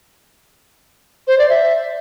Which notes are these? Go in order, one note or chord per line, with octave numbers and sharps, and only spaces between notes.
C5
D5
E5